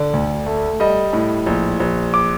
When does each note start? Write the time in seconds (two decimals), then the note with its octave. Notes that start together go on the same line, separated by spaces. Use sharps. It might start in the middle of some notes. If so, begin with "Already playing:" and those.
Already playing: D3 D5
0.13 D2
0.46 A3
0.80 G3 D#5
1.13 A2
1.46 A#1
1.80 A#1
2.14 D6